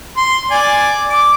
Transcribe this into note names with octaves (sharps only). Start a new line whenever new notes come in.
C6
D5 G#5
D6